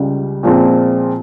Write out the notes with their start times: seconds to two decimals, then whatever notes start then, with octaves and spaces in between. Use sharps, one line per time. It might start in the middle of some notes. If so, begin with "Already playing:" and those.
Already playing: C#2 C#3 G3
0.43 A#2 F3 G#3 C4